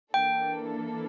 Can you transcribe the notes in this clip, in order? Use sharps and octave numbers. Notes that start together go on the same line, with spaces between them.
E3 A#3 D4 A4 G5